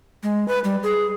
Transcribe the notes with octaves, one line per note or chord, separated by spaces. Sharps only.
G#3
B4
G3
G#4